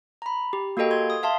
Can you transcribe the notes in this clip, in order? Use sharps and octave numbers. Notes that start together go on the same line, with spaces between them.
A#5 B5
G4
A#3 F#4 G4 A4 D#5 G5
C6 G#6
D#6
E5 F5 A5 C6